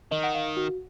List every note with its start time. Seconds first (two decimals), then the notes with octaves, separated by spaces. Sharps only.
0.11 D#3 D#5
0.23 F#5
0.35 F5
0.57 F#4